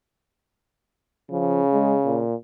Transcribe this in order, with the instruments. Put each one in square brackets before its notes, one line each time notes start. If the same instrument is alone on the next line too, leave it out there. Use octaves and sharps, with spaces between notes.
[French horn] C#3 [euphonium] F3
[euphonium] G#3
A#2